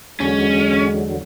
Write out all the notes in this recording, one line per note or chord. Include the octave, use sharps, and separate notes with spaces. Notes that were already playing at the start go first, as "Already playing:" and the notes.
E2 D3 F#3 G#3 C#4